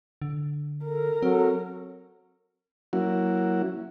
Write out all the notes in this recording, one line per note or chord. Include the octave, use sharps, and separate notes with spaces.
D3
A4 A#4
F#3 C4 A4
F#3 A#3 C#4 E4 F#4